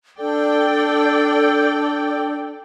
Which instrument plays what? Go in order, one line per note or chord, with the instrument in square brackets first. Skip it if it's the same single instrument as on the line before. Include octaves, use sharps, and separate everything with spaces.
[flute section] D4 A4 [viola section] D5 G5